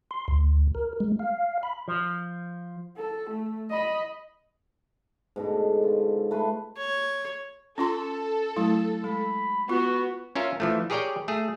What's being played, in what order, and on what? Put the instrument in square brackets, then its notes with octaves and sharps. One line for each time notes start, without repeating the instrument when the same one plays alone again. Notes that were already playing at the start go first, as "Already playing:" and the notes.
[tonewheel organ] C6
D2
A#4
G#3
F5
B5
[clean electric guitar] F3
[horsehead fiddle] A4
A3
D#5 B5
[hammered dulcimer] G#2 B2 D3
F4
A3 B4 B5 C6
[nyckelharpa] C#5
[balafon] C#4 F4 C6 [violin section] A4
[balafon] F#3 A3 E4
[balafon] G#3 [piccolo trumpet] B5
[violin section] B3 [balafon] F4 [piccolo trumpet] F#4
[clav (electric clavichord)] C#4 F4 A#4 E5
E3 F3 A3
G4 G#4 A#4 C#5 D5 G5
A3 G#4